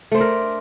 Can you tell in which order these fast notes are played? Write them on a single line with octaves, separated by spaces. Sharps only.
A3 C5 D4 A#4